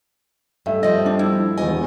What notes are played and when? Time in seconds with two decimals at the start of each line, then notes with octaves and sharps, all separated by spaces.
0.66 G2 A3 E5
0.83 G2 F3 G3 D#5
1.06 D4
1.19 E4
1.58 E1 E2 B3 D#5 G#5